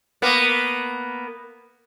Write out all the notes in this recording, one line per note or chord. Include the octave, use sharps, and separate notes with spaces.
A#3 B3